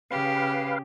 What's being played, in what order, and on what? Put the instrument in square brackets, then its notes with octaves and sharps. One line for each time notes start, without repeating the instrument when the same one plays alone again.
[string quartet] C#3 G4 [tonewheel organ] B4 F5